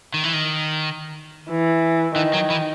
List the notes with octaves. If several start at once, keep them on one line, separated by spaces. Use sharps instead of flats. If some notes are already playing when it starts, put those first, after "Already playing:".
D#3
E3
D#3
E3
D#3 E3
F#3
E3